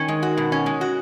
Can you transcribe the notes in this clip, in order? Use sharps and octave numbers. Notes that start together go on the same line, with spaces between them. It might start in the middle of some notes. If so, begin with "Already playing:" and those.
Already playing: D#3 C#4
G#3
F#4
B2
C#4
G#3
F#4